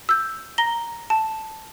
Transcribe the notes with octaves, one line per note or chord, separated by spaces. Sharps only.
E6 G6
A#5 A#6 G7
A5